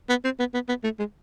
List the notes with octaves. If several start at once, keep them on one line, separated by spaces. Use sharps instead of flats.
B3
C4
B3
B3
B3
A3
G#3